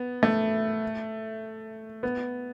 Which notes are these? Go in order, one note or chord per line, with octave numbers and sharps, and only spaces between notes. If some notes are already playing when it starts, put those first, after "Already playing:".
Already playing: B3
A3
B3